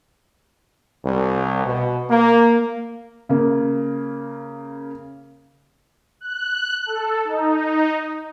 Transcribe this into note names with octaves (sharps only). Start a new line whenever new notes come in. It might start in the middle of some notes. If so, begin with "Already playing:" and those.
C2
B2
A#3
C#3 A#3
F#6
A4
D#4